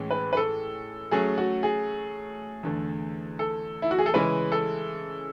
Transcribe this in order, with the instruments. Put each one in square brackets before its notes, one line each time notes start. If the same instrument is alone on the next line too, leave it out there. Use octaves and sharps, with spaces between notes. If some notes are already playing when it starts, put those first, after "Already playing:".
Already playing: [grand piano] A2 E3 G#3 C#4
[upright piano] B4
B4
A4
[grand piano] F#3 A3 C#4 [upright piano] G#4
[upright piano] F#4
G#4
[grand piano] E2 D3 A3
[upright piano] A4
E4
F#4
G#4
A4
[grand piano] C#3 E3 G#3 C#4 E4 [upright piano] B4
[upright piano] A4